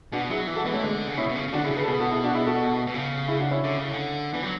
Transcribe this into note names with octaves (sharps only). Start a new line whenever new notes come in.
B2 D4 F#4
F#3 E4 G#4
E3
F#4 A4
E3 G#3 B3
A3 C#4
D3 G#3
C#3
B2 C#4 E4
B2
C#3
C#3
D3 D4 F#4
E4 G#4
C#3
G#4 B4
A4
B2 G#4 B4
F#4 A4
E4 G#4
D4 F#4
E4 G#4
F#4 A4
B2
C#3
E4 G#4
D4 F#4
C#4 E4
D3
C#3
D3
E3 B3 D4
F#3